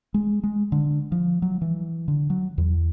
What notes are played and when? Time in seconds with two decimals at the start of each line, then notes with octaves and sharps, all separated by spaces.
0.14 G#3
0.43 G#3
0.72 D3
1.12 F3
1.42 F#3
1.62 E3
2.08 D3
2.30 F#3
2.58 E2